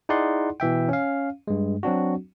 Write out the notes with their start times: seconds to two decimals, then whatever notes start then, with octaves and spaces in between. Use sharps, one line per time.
0.09 D#4 E4 G#4 D5 F#5 C6
0.60 B2 E3 E5 G5
0.89 C#4 F5
1.47 G2 G#3
1.83 F#3 C4 D4 F#4